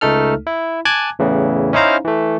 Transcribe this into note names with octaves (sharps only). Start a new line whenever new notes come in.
C#2 A3 D#4 A4 F6
E4
G#5 A5 D6 F#6 G#6
E2 A2 C#3 E3
C#4 D#4 E4 C5 F5 A#5
E3 A3